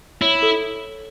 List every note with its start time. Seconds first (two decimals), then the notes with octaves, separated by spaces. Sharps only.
0.22 E4 C#5
0.42 A4